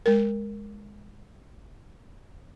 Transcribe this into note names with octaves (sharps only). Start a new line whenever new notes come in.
G#3 A#4